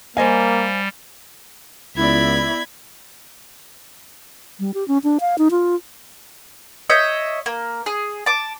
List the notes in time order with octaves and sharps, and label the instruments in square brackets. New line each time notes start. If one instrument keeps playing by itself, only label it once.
[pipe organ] G3 [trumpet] A#3 [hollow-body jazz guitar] C5 D#5 F5 [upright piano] G#5
[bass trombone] C#2 [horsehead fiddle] B3 D5 [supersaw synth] E4 [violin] B5 G#6
[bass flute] G3
G4
C#4
D4
F5
D#4
F4
[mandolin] C#5 D#5 E5 G6
A#3
G#4
A5 D6